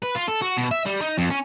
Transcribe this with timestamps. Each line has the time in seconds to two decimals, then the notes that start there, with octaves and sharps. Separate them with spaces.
0.03 B4
0.16 F4
0.28 A4
0.42 F#4
0.57 B2
0.71 E5
0.86 G3
1.01 D#4
1.18 F2
1.30 C#4